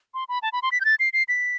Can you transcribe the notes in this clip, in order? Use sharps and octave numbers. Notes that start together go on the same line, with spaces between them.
C6
B5
A5
B5
C6
B6
G6
A6
C7
C7
B6